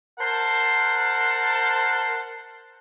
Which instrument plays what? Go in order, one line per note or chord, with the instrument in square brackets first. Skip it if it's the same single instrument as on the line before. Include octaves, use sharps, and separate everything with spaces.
[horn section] A#4 C5 F#5 A5